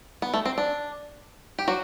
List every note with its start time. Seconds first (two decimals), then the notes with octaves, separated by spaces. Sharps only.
0.22 B3
0.34 A3
0.46 C4
0.58 D4
1.59 G4
1.68 F#3 F#4